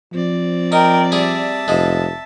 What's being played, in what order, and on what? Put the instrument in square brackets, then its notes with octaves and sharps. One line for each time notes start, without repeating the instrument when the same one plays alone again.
[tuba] F3 [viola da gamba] C4 D5
[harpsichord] D#4 [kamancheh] A#4 G5
[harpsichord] G3 G#4 [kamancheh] E5 A5
[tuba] F1 [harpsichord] F3 G#3